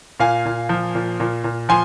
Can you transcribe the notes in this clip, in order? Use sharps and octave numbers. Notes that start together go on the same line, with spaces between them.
A#2 F5 G#5
A#2
F3
A#2
A#2
A#2
F3 G#5 C6